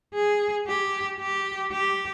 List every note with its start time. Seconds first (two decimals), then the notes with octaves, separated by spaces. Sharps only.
0.15 G#4
0.67 G4
1.20 G4
1.72 G4